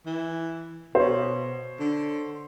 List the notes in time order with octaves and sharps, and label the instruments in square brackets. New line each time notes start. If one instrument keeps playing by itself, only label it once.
[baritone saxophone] E3
[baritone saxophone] B2 [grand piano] C5 C#5
[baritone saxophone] D3